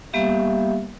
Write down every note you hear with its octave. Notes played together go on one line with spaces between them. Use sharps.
G3 A#3 B3 G4 E5 F5